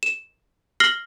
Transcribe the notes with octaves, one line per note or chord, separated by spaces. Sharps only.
E7
F6 A#6 C7 F#7 G7